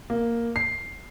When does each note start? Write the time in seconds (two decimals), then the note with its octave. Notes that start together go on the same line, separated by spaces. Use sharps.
0.10 A#3
0.56 C7